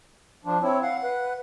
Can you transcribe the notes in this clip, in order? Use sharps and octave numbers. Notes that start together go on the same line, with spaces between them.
F3 D4
C4 E4 C#5
F5 F#5
B4